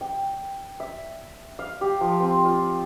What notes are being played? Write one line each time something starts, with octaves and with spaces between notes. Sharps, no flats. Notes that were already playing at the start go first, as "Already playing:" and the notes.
G5
E5
F5
G4
F3
C4
F4